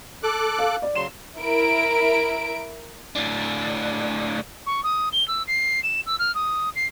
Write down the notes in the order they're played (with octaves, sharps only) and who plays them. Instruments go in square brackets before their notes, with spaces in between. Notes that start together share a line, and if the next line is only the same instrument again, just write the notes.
[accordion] A4 D6 F#6
[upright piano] F5
D5
[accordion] C#3 F#3 C6 [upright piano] E7
[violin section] E4 A#4 D7
[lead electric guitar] A2 D4
[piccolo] C#6
D#6
G7
E6
C7
E7
E6
F6
D#6
C7